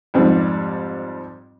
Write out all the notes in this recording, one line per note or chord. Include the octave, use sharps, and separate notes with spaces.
F2 G#2 G3 C4